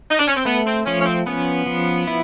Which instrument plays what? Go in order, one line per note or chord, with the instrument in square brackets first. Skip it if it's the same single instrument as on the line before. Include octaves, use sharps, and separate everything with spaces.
[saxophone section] D#4
D4
C#4
C4
[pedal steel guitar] A3 [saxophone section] B3
[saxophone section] C4
[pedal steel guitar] F3 [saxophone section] C#4
[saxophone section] C#4
C4
[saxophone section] B3 [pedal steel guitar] C#4
[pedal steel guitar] F3
E4